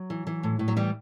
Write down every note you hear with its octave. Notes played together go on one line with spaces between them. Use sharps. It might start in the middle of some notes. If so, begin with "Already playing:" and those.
Already playing: F#3
E3
E3
A2
A2
F#3
E3 G3